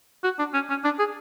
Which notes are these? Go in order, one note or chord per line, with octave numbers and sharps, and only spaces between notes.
F#4
D4
C#4
C#4
D4
G#4